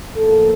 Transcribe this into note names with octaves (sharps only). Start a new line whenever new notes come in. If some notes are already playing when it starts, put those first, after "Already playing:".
A2 F3 A#3 A4